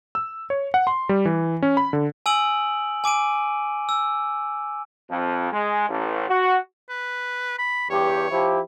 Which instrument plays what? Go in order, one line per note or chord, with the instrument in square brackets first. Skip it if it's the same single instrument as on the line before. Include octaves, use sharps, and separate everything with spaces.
[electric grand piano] E6
C#5
F#5
C6
G3
E3
C#4
B5
D3
[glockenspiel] G#5 D#6 E6 D7 F#7
G#5 D6 D7 D#7
E6
[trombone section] F2
G#3
A1
F#4
[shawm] B4
B5
[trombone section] E2 G2 G4 [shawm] C#5
[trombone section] F3 E4 G4